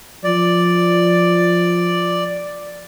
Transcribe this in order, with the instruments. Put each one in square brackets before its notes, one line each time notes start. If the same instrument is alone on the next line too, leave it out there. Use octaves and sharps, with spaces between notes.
[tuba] F3 [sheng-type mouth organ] D5